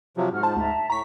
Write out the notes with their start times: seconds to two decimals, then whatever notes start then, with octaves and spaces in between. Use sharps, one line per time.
0.17 C3 F3 F#3
0.32 G#2 F#4 F#5 F6
0.43 D#4 F4 C5 A5
0.56 D2 E5 A5 A#5
0.90 A2 A#5 C#6 B6